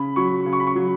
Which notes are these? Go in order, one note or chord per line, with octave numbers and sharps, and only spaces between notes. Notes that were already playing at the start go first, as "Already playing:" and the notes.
Already playing: C#3 B5
F#3 C#6
C#3
C#6
B5
C#6
F#3